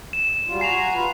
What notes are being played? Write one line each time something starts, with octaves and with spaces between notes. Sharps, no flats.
E7
F#3 G3 F4
F#4 G#5 A#5 C7 E7 F7
F4 B4